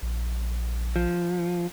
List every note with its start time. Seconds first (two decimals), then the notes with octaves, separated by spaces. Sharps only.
0.02 A#1
0.96 F3